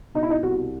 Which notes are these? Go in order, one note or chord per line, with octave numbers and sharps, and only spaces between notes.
B2 D#4
E4
D#4
C2 F#4